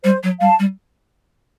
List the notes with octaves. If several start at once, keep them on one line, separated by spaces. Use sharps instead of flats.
G3 C5
F#3
G3 F5 A5
G3